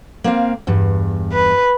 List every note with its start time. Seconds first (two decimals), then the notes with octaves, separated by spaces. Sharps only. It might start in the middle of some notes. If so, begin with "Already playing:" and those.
0.24 A#3 C4 F5
0.67 E2 G2
1.32 B4